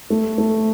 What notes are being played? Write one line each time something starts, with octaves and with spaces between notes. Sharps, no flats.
A3
A3